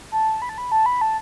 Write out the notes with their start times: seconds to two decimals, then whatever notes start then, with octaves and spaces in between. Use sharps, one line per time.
0.12 A5
0.42 B5
0.49 A5
0.58 B5
0.72 A5
0.86 B5
1.01 A5